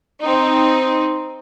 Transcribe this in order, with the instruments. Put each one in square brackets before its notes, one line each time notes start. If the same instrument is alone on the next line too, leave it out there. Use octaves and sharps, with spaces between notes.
[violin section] C4 D#4